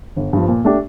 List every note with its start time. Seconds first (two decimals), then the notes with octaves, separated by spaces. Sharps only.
0.16 G1
0.33 G2 F3
0.48 A#2
0.65 A3 D4 G4